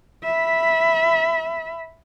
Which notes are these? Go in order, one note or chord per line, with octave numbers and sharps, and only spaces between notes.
E5 B5